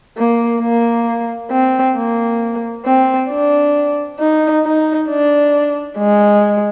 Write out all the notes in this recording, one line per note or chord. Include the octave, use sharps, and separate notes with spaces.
A#3
A#3
C4
A#3
C4
D4
D#4
D#4
D4
G#3